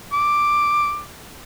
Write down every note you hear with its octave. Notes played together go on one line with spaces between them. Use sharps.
D6